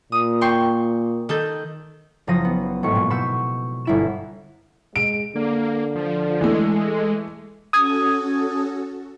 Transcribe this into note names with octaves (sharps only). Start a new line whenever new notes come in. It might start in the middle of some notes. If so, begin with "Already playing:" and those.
A#2 D#6
G5 C6 C#6
D#3 A4 G6
F#1 F3 D#6 A#6
B3
G#1 A2 C#6
A#2
B2 B4 C#6 E6 G6
G1 E4 E7
G#3 D7
D3 A#3
F3
E3 G#3 A3
C#4 F#4 A4 D#6 G#6